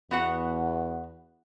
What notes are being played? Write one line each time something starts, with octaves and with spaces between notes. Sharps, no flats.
E2 B3 F#4 F#5